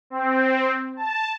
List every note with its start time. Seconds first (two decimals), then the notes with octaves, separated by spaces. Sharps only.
0.10 C4
0.97 A5